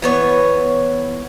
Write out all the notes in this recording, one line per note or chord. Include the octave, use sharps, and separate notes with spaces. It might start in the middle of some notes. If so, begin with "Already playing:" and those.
E3 B3 C#5